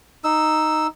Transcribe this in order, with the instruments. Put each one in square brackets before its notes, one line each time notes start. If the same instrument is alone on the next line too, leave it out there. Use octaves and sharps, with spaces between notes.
[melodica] D#4 E6